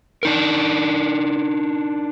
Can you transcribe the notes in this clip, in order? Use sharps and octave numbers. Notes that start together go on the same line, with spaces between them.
D4 D#4 A#4